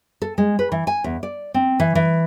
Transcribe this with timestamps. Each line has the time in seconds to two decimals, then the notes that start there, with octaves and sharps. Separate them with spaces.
0.22 A4
0.38 G#3
0.59 B4
0.72 E3
0.87 G#5
1.04 E2
1.23 D5
1.54 C4
1.80 E3
1.95 E3